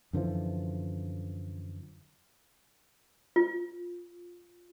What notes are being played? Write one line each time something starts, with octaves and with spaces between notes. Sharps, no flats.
F#2 D3 E3 F3
F4